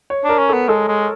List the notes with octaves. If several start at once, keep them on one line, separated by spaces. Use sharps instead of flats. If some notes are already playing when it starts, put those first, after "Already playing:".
C#5
D4 A#4
C#4
B3 A4
G#3 A4
G#3